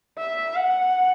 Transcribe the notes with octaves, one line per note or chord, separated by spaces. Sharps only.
E5
F#5